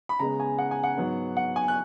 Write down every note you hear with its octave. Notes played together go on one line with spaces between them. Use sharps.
B5
C#3 G#3 B3 A#5
G#5
F#5
G#5
F#5
G#2 F#3 B3
F#5
G#5
F#6